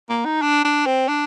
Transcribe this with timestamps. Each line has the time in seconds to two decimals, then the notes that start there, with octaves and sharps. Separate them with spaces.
0.09 A#3
0.25 D#4
0.42 D4
0.64 D4
0.86 C4
1.08 D4